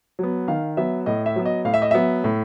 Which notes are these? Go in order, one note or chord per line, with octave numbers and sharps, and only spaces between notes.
F#3 B3
D#3 F5
F#3 B3 E5
A2 D#5
E5
F#3 B3
D#5
A2 F5
E5
D#5
F#3 B3 E5
A2